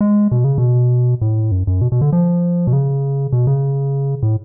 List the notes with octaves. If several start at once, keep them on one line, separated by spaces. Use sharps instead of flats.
G#3
B2
C#3
B2
A2
F#2
F#2
B2
B2
D3
F3
B2
C#3
B2
C#3
A2